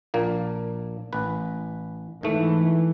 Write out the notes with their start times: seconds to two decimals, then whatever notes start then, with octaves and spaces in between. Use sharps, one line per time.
0.14 A#1 A#2 A#3
1.13 A1 B4
2.23 G#2 E3 A3